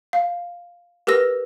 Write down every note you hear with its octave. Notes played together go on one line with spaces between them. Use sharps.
F5
G4 A#4 B4 E6 A#6